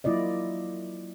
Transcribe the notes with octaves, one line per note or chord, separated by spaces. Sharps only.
F#3 A#3 E4 F4 D5 D#5